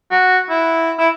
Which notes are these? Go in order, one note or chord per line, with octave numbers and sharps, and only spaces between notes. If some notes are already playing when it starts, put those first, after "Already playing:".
F#4
E4
E4